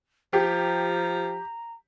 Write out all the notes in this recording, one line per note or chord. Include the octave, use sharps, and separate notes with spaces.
F3 G4 A#5